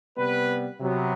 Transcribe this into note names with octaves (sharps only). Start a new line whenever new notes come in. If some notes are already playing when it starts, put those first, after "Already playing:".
C3 G3 B3 B4
C3 F#3 B3